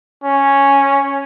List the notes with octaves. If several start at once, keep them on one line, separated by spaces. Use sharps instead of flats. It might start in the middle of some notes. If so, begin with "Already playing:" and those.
C#4